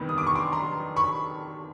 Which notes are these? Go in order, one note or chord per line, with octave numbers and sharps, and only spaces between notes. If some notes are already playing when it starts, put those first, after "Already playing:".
Already playing: E2 C3 D#3 G3 B3
D#6
D6
C#6
C6 D6
A#5 C6
B5 C#6